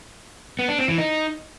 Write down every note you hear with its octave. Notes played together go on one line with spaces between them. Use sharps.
B3
D4
C4
E3
D#4